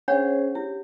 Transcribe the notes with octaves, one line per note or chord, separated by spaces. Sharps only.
C#4 D4 G#4 C5 C#5 F#5
E4 G4